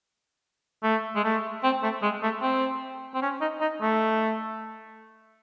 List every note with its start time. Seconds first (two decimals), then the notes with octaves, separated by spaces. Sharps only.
0.83 A3
1.16 G#3
1.24 A3
1.64 C4
1.83 A3
2.02 G#3
2.23 A3
2.42 C4
3.14 C4
3.22 C#4
3.41 D#4
3.61 D#4
3.81 A3